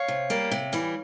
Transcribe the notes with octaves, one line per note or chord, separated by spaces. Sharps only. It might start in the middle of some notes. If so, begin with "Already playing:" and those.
Already playing: C#5 F5
C3
G3 A#3
C3
E3 G3